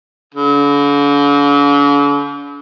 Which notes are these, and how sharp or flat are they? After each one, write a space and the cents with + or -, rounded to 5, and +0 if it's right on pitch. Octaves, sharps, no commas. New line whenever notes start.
D3 -45